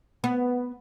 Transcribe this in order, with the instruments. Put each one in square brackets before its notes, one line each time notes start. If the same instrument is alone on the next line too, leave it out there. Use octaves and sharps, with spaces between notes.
[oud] B3